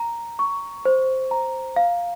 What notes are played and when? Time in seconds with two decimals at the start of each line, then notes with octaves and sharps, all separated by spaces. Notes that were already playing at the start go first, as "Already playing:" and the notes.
Already playing: A#5
0.39 C#6
0.85 C5
1.31 A#5
1.76 F5